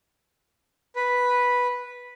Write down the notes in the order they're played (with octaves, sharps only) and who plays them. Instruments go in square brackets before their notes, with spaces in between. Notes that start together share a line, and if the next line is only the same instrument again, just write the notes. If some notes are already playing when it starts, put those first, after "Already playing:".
[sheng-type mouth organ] B4